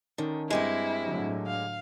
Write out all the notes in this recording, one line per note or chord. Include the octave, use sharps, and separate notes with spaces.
D3 D#3 C#4 D#4
G2 G#3 C4 E4 G4 A#4
A2 D3 F#3
F5